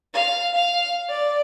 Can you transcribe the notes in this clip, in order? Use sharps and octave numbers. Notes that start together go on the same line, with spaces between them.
F5
F5
D5